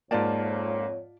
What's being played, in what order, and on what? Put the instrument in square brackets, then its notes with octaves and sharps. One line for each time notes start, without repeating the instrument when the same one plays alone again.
[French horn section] F2 C#5 [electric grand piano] G#2 A#3 [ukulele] F4 D5 A5